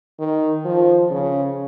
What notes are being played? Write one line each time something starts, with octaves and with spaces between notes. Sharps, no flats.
D#3
F3
C#3